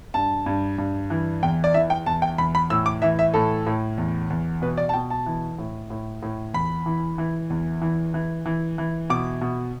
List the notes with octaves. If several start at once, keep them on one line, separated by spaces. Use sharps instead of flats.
G2 A5
G2
G2
E3
E2 G5
D5
E3 E5
G5
E2 A5
G5
E2 B5
B5
A2 E6
D6
E3 E5
E5
A2 A4
A2
E2
E2
B2 B4
D5
A5
B2 G5
A5
E3
A2
A2
A2
E2 B5
E3
E3
E2
E3
E3
E3
E3
B2 D6
B2